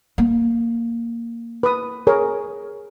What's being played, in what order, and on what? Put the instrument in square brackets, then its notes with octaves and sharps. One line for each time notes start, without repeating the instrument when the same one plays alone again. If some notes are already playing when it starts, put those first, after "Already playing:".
[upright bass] A#3
[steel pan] B4 D#6
G#4 A#4 C#5